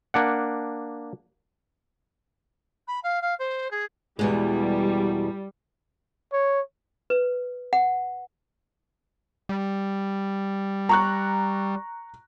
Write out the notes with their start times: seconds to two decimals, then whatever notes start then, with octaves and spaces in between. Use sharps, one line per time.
0.14 A#3 D4 F#5
2.87 B5
3.03 F5
3.22 F5
3.39 C5
3.71 G#4
4.19 E2 B2 G3 G#3
6.33 C#5
7.10 B4
7.73 F#5
9.49 G3
10.89 A#5 C#6 F#6